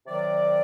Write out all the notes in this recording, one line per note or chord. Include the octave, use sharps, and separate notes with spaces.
C3 D#3 F#3 D5